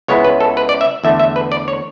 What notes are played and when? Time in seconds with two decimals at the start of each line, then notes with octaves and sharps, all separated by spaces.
0.08 C#2 C#3 G#3 B3 E4 C#5
0.24 B4
0.41 A4
0.57 B4
0.69 D5
0.81 E5
1.04 E2 D3 A3 E5
1.19 E5
1.36 B4
1.52 D5
1.68 C#5